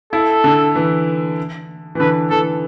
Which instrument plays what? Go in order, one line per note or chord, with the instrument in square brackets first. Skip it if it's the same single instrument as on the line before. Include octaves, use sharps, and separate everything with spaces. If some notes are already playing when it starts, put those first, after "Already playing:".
[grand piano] E4 [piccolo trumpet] A4
[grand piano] D3
E3
E3
[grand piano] D3 [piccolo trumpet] B4
[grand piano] E3 [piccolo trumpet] A4